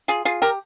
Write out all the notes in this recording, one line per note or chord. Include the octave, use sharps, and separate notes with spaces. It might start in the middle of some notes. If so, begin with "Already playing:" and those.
F4 G#4
F4 G#4
G4 A#4